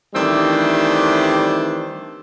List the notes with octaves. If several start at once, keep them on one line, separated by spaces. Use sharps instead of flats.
D#3 E3 G3 A3 C4 D4